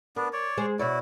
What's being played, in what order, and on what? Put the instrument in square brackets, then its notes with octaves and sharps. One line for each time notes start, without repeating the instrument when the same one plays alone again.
[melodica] B3 D4 [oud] A#4
[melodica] C#5 D5
[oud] G#3 G#4 C5
[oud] B2 C#5 D5 [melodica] E4 F#4